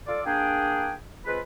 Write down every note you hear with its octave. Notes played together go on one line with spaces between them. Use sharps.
F4 A4 D5
A#3 D4 G#4 G5
G#3 C4 F4 G#4 B4